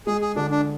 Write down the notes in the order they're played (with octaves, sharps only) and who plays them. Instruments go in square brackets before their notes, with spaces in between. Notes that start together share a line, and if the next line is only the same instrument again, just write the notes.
[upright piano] G#3 [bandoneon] G#4
[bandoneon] G#4
[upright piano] D3 [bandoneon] D4
[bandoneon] D4